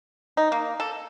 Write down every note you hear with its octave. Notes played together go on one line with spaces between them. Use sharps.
D#4
A#3
A4